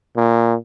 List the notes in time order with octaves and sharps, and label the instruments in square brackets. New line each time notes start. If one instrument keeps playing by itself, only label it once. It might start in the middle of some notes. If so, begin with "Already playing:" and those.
[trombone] A#2